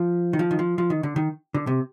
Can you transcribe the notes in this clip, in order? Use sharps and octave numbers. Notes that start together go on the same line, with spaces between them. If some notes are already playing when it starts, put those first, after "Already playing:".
Already playing: F3
D#3
F3
D#3
F3
F3
D#3
D3
D#3
D3
C3